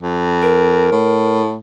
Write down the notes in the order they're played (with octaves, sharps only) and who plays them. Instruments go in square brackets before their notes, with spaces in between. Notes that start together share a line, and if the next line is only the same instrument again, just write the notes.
[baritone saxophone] F2
[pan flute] A#4
[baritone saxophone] A2